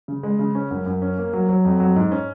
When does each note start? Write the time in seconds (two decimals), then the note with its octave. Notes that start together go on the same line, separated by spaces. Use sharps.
0.08 C#3
0.23 G#3
0.39 C#3
0.55 C#4
0.71 F#2
0.86 F#2
1.02 C#4
1.18 A#3
1.33 F#3
1.49 F#3
1.65 F2
1.80 F#3
1.96 G#2
2.12 C#4